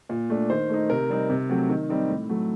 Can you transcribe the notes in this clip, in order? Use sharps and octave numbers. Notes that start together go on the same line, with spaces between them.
A#2
A3 D4
D#3 C5
A3 D#4
C3 A#4
G3 C4 D#4
C3
F#3 A3 C4
D#3
G3 C4 D#4
A2
F#3 A3